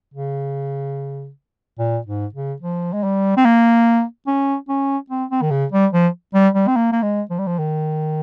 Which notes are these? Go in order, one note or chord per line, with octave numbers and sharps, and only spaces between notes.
C#3
A#2
G#2
C#3
F3
G#3
G3
C4
A#3
C#4
C#4
C4
C4
D#3
C#3
G3
F3
G3
G3
C4
A#3
A#3
G#3
F3
G3
F3
D#3